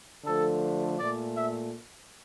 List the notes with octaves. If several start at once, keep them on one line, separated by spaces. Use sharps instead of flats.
D3 F3 A3 A4
A#2 A3 D5
E5